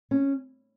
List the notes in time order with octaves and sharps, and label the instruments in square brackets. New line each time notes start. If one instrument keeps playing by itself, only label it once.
[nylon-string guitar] C#4